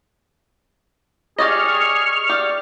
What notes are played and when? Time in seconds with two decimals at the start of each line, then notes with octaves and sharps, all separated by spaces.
1.38 G4 G#4 D5 D#5 C#6 F6
2.29 G4 D5